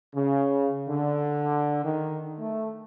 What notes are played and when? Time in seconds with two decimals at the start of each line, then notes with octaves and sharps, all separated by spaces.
0.15 C#3
0.88 D3
1.84 D#3
2.40 A3